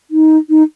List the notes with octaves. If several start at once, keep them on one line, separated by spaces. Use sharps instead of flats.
D#4
D#4